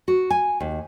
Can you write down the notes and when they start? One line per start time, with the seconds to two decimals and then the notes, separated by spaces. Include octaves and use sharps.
0.08 F#4
0.30 G#5
0.60 D#2